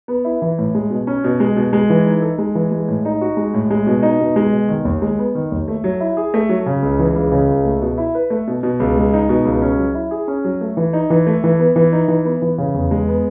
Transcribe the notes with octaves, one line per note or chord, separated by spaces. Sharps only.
B3
E4
E3
A2
G#3
B2
C#4
B2
G#3
B2
G#3
E3
D#4
A4
G#3
E3
G#3
A2
D#4
F#4
G#3
A2
G#3
B2
D#4
B2
G#3
B2
D#3
D#2
G#3
B3
D#3
D#2
A3
F#3
E4
G#4
A3
F#3
C#3
C#2
E3
C#2
C#3
C#2
A3
B2
E4
B4
A3
B2
B2
C#2
G#3
D#4
B2
C#2
C#4
F#3
E4
G#4
C#4
F#3
A3
E3
D#4
E3
A3
E3
B3
E3
D#4
E3
B3
E3
C#3
E2
G#3
B3